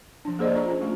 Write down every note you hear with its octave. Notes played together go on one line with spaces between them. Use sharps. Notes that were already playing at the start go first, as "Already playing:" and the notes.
F3 D4
A#3 G#4 C5 D5 D#5
D4 F4 A#5
C#4
A3 F4